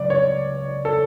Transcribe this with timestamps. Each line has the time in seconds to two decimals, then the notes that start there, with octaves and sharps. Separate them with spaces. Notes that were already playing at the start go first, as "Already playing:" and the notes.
Already playing: C#2 C#3 F#3 B3 D5
0.10 C#5
0.85 A4